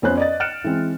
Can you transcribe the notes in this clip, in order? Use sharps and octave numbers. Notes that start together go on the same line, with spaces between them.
F2 B3 C#4 C5 F#6
D5 D#5 A6
F6 F#6 A6 C#7 D7 E7
E3 G#3 C4